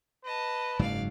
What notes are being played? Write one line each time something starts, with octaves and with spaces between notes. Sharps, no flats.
B4 D#5 A5
F#1 G#2 F#3 D5 F5